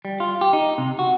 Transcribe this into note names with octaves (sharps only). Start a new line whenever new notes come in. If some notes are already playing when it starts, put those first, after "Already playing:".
G3
F4
G4
D#4
C3
F#4